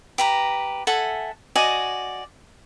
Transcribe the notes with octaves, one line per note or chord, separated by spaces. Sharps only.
G4 B4 A#5
A4 E5 F#5 G#5
F#4 D5 D#5 G#5